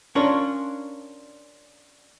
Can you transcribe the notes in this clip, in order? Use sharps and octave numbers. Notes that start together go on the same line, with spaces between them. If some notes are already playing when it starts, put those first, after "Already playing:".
C#4 D4 F4 A#4 C#5